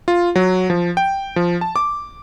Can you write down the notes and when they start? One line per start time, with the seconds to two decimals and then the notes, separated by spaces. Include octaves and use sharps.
0.08 F4
0.36 F#3
0.70 F3
0.97 G5
1.36 F3
1.61 A5
1.76 D6